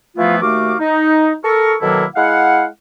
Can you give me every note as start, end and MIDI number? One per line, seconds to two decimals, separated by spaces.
0.17 0.40 52
0.17 0.40 53
0.17 0.40 57
0.17 0.40 59
0.17 0.40 64
0.17 0.40 65
0.41 0.74 39
0.41 0.74 57
0.41 0.74 66
0.41 0.74 77
0.41 0.74 86
0.79 1.34 63
1.44 1.74 69
1.44 1.74 70
1.44 1.74 85
1.81 2.05 47
1.81 2.05 51
1.81 2.05 54
1.81 2.05 58
1.81 2.05 64
1.81 2.05 69
2.15 2.65 56
2.15 2.65 64
2.15 2.65 77
2.15 2.65 78